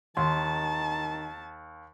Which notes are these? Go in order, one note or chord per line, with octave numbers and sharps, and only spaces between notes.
D#2 D#3 A5 C6